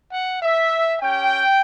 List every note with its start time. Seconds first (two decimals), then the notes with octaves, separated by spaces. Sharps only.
0.12 F#5
0.42 E5
1.01 C#4 G4 G5